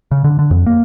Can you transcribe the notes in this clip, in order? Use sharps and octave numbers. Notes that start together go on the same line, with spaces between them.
C#3
D3
D3
F2
A#3